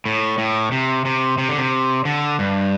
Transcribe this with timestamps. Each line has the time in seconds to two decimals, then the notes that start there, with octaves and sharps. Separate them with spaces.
0.06 A2
0.38 A2
0.72 C3
1.05 C3
1.38 C3
1.49 D3
1.58 C3
2.05 D3
2.39 G2